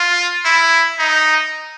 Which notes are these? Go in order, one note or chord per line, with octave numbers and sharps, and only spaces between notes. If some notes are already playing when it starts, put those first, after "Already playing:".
Already playing: F4
E4
D#4